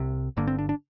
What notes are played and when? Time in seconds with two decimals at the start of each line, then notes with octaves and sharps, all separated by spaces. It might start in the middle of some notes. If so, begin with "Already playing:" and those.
Already playing: C2 C3
0.37 G1 G2 D3 A#3
0.47 C4
0.59 D4
0.69 D4